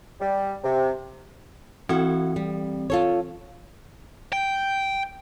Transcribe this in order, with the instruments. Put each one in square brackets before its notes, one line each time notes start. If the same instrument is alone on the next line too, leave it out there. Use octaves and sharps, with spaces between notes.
[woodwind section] G3
C3
[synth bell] E3 C4 [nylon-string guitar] E4 F#4
[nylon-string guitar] G3
F4 A4 C#5
[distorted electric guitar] G5